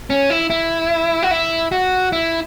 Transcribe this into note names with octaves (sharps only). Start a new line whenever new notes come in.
C#4
E4
E4
F#4
E4
F#4
E4